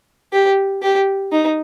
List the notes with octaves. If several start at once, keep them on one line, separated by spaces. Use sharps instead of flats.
G4
G4
D#4